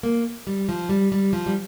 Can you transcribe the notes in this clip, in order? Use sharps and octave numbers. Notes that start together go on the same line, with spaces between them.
A#3
G3
F3
G3
G3
F3
G3